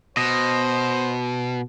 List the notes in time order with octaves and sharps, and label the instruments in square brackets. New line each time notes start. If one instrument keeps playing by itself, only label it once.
[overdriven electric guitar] B2 [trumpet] C5 [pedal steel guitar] D#5